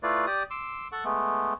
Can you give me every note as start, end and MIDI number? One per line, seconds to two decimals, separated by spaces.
0.03 0.26 57
0.03 0.26 64
0.03 0.26 65
0.03 0.26 71
0.03 0.26 74
0.27 0.43 67
0.27 0.43 74
0.27 0.43 87
0.50 0.88 84
0.50 0.88 86
0.50 0.88 88
0.92 1.04 69
0.92 1.04 78
0.92 1.04 85
1.04 1.54 56
1.04 1.54 57
1.04 1.54 59